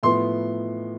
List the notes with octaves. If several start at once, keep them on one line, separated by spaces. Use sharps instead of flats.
A2 F3 B3 C6